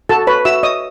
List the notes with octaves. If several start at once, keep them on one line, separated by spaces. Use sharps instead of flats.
F#4 A4 A5
B4 C#5 B5
F#4 E5 E6
C#5 D#5 D#6